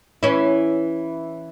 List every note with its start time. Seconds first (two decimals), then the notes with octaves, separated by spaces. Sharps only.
0.23 E3 C#4 E4